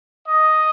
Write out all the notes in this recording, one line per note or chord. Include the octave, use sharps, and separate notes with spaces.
D#5